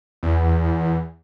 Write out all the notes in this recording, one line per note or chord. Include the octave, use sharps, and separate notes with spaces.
E2